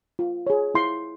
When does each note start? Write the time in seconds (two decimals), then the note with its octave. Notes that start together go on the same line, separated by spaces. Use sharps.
0.19 F4
0.47 G#4 C#5
0.74 E4 C6